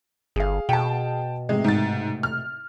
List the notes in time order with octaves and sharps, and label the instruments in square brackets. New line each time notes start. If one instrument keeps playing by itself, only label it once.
[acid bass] G1 [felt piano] G#4 F5
[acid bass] B2 [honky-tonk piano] G5 A5
[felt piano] A2 C3 [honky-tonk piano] G#3
[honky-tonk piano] G#2 A6
F6